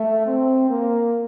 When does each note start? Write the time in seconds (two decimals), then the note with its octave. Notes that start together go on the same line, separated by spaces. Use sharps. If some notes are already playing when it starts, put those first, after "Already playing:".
Already playing: A3
0.27 C4
0.69 A#3